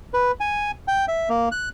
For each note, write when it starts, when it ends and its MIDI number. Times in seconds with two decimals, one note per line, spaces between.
0.14 0.32 71
0.40 0.71 80
0.88 1.05 79
1.08 1.29 76
1.29 1.49 58
1.52 1.69 90